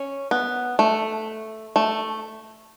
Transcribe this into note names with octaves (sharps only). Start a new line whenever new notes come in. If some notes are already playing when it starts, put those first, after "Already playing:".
Already playing: C#4
B3
A3
A3